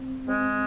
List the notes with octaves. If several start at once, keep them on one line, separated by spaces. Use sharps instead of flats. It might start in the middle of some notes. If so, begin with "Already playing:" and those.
Already playing: C4
G#3 C4